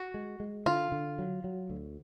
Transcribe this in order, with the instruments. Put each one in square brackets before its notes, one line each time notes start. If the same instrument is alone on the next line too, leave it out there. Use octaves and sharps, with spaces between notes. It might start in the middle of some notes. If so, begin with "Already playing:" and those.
Already playing: [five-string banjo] F#4
[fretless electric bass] G#3
G#3
[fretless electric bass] D3 [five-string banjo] F4
[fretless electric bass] D3
F#3
F#3
D2